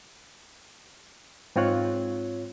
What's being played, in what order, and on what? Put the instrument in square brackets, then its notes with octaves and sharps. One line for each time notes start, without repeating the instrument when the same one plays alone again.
[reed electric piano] G#2 C4 F4 C#5 F#6